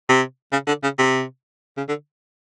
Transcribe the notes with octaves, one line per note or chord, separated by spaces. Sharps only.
C3
C#3
D3
C#3
C3
C#3
D3